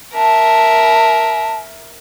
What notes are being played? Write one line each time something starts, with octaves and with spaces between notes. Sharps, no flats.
A#4 E5 A5